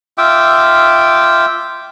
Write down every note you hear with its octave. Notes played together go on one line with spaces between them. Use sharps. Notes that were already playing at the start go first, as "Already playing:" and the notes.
F4 E5 G5 D6